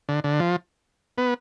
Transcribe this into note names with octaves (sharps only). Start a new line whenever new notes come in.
D3
D3
F3
B3